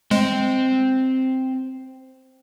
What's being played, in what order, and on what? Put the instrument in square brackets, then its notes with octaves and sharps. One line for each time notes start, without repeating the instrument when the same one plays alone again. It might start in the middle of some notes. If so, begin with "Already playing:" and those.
[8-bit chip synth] G#3 [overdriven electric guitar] C4